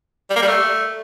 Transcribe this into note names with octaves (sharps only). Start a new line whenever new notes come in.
G3
A#3
G3
A3